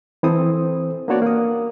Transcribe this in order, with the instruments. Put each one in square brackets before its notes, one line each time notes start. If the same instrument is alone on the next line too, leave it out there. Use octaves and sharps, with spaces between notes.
[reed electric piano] E3 C4 E4 A4 C5 D#6
A#3 B3 D4 F#4 C#5 D5
A#3 D#6